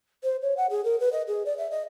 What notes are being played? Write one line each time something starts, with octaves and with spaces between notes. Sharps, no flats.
C5
C#5
F#5
G#4
A#4
B4
D#5
G#4
D5
E5
D#5